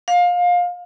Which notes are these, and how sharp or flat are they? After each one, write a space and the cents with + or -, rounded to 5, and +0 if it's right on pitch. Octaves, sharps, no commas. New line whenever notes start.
F5 +25